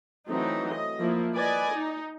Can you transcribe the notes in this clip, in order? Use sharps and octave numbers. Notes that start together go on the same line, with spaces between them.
E3 F#3 A3 C4 D#4
D#5
F3 A#3 E4
B4 D5 D#5 G#5
D#4